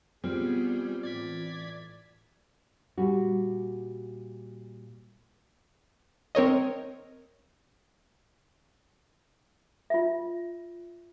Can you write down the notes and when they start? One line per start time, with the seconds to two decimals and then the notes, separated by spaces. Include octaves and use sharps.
0.24 B2 G3 B3 C4 F4 G#4
1.03 A2 E3 D5 G#6 B6
2.98 A#2 G3 F#4
6.35 C4 A#4 C#5 D#5
9.90 F4 E5